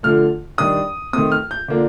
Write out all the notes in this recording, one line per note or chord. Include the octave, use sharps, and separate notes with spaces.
D3 F3 A3 F6
D#3 G3 D4 D#6
D#3 A3 C4 D#6
F6
G6
D3 F3 A#3 D4